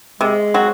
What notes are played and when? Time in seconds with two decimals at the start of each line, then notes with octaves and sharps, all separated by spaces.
0.20 C3 G#3
0.54 F#3 C4 F#4